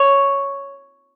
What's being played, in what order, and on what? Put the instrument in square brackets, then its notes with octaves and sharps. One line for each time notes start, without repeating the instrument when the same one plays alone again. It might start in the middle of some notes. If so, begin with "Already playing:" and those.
Already playing: [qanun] C#5